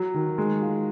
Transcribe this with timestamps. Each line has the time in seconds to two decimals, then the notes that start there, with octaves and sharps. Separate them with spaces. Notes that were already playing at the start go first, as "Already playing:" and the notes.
Already playing: F#3
0.14 D#3
0.38 G#3
0.61 F4